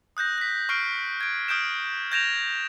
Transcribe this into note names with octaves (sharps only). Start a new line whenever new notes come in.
D#6 F#6 G6 A#6
A#6 B6
C#6 F6 C7 D7
G#6 D7
D#6 F6 G6 D7 E7
G6 G#6 A#6 D7 E7 F7